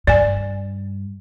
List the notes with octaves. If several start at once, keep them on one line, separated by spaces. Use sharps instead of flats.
G2 D5 G#5